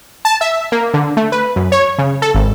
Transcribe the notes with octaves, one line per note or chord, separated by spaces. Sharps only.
A5
E5
A#3
D3
A3
B4
F#2
C#5
C#3
A4
G#1